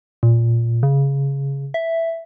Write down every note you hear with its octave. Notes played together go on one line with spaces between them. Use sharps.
A#2
C#3
E5